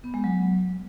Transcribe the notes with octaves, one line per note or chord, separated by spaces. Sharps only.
B3
G#3
F#3